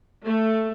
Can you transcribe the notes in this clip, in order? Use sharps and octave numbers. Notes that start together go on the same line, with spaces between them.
A3